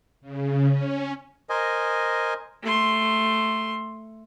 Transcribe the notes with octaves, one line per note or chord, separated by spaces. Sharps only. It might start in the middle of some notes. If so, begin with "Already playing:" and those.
C#3
C#4
A#4 C5 D#5 G#5
A3 C6